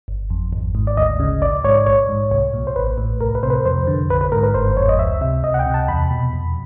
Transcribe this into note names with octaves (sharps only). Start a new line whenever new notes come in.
G1
F2
G#1
G#2
D5
D2 D#5
C#3
A#1 D5
G#2 C#5
A#1 C#5
G#2
C2 C#5
A#2
C5
A1 B4
A2
C2 A#4
B4
C3 C5
B4
F2 C5
D3
A#1 B4
B4
G#2 A#4
B4
G1 C5
F2 C#5
D#5
C#2 E5
C3 E5
C#2 D#5
F#5
G5
C3
A5
E2 B5
B2
F2